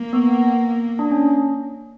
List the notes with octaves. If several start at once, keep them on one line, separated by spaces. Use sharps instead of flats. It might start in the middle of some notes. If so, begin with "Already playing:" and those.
Already playing: A#3
B3
D4
C#4